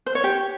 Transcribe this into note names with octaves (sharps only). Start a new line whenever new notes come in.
C5
C#5
G4